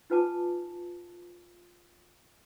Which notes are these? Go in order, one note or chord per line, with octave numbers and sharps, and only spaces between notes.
D#4 F4 B4 G#5 A5 D6